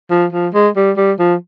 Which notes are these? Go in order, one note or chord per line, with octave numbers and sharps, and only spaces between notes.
F3
F3
G#3
G3
G3
F3